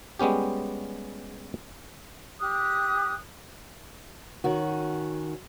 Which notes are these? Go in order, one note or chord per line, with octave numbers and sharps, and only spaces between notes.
G3 G#3 B3 C#4 G4
G4 D#6 F#6
D#3 C#4 F#4